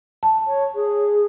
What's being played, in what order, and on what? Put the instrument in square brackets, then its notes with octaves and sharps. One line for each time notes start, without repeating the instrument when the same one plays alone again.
[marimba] A5
[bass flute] C#5
G#4